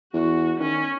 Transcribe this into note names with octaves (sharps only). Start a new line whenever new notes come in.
E2 F#4
D#3 C#4